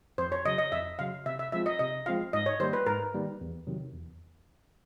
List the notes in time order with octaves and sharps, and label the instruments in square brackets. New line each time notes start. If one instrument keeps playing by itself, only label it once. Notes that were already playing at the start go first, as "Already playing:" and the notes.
[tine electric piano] F2 [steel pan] C5
[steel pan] C#5
[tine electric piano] C#3 F#3 [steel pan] D#5
[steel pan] D#5
[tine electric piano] F2 [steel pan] E5
[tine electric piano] C#3 F#3 [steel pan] F5
[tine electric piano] C3 [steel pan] E5
[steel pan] E5
[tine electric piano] F3 G#3 C4 F4 [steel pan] E5
[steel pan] D#5
[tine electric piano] C3 [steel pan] D#5
[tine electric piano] F3 G#3 C4 F4 [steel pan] F5
[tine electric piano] G#2 [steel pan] D#5
[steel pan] C#5
[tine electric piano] D#3 G3 A#3 [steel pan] C5
[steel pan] B4
[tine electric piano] G#2 [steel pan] A#4
[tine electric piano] D#3 G3 A#3
E2
C3 D#3 F#3
E2